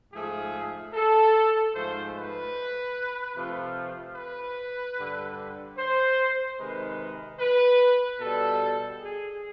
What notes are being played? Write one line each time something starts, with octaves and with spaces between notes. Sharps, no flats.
G#2 F3 A3 G#4
A4
G#2 F3 A3 C5
B4
C3 F3 A3
B4
G2 D3 G3
C5
C3 D#3 G#3 B4
B4
B2 G3 A4
G#4